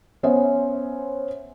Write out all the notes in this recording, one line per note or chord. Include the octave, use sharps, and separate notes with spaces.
B3 C#4 C5 E5